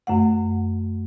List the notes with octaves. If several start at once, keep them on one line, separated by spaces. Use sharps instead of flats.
F#2 A3 F#5